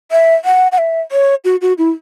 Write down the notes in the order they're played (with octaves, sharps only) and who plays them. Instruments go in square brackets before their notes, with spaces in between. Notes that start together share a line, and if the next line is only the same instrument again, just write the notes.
[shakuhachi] E5
F#5
F#5
E5
C#5
F#4
F#4
E4